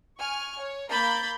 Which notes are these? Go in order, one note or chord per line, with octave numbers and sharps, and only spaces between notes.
G#5 C#6 F6
C#5
A#3 A#4 B5 G6 A6